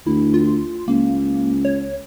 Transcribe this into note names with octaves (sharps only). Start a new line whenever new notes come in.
D2 E4
F4
C#2 A#3
C#5